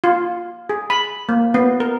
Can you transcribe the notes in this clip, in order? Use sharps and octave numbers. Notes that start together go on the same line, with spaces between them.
F4
G#4
B5
A#3
B3
A#4